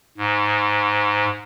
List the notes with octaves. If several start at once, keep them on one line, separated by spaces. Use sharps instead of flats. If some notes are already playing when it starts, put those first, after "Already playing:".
G#2